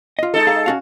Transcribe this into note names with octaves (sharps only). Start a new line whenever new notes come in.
F4 D#5
G#3 D#4 A4
G#4 F5 A#5
C#4 F#4 F5